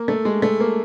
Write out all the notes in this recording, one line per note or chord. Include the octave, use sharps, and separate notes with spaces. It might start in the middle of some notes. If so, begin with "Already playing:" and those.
Already playing: A#3
A3
G#3
A3
A#3